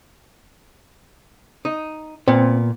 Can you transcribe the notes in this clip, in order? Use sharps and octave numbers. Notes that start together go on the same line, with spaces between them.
D#4
A#2 B3 C4